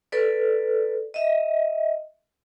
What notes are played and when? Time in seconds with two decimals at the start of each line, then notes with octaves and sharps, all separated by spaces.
0.12 A4 B4 D5
1.14 D#5 E5